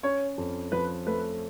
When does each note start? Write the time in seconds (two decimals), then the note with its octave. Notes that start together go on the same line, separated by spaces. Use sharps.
0.03 C#4 C#5
0.38 F2
0.72 F3 B4
1.07 A3 B4